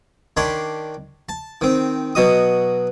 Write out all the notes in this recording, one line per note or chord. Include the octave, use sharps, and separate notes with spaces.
D#3 D4 C#5 B5 C6
A5
D#3 C4
B2 F#3 D#5 D#6